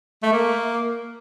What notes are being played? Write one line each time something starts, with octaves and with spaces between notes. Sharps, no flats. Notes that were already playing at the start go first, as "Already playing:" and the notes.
A3
A#3